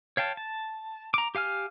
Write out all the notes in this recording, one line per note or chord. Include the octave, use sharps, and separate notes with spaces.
C#5 F5 G5 A5
A5
A#5 D6
G4 F5 G#5 F6